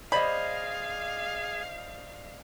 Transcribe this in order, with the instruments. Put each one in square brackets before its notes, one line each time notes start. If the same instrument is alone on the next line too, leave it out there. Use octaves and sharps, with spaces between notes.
[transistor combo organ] G#4 [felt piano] C5 D5 D#5 [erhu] F5 [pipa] B5